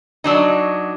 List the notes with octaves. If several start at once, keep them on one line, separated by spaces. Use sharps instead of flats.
F#3 D4 D#4